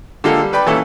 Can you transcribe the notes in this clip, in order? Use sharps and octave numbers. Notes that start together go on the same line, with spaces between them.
D3 G#3 A#3 F4 G4 A4
G3
B4 D5 G5 B5
A#2 E3 C#4 E4 A4